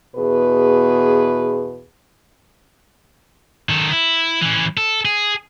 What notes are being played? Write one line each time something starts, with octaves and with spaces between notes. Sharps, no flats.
E2 B2 G#4 B4
D#3 A4
E4
E3 C#4
A4
G#4